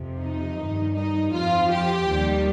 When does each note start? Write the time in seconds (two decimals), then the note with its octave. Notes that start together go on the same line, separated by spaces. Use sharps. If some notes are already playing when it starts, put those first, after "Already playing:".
Already playing: F2 C3 F3
0.20 D#4
0.58 G2 D#3 G3
0.94 D#4
1.32 F2 F3 F4
1.70 G4
2.08 D#2 D#3 G3